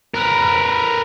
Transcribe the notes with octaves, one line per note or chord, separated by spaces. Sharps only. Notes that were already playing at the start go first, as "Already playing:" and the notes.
A#4 B4